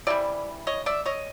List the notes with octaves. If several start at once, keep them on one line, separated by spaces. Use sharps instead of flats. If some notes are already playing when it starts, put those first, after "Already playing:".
C3 E3 G3 D5 E5
C#5 D#5
D5 E5
C#5 D#5